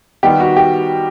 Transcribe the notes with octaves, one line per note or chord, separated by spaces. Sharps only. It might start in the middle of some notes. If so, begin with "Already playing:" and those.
D#3 G3 B3 D#4 G4
F#4
G4